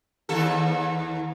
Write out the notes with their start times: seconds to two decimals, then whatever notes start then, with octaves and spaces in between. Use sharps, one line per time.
0.29 D#2 A4